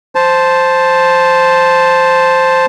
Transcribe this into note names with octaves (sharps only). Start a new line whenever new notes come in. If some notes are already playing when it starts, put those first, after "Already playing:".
C5 A5